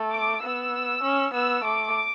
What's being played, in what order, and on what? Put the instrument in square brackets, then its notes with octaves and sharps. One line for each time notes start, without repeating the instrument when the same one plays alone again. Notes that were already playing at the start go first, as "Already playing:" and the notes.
Already playing: [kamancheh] A3
[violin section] D6
[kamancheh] B3 [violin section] E6
[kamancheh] C#4
[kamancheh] B3 [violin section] E6
[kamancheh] A3 [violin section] D6